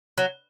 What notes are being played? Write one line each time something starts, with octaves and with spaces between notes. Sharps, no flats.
F#3